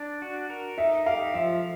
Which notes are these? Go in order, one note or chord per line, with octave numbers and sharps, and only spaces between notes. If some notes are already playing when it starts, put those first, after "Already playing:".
Already playing: D4
F#4
A#4
D#4 E5
G4 F5
F3 E5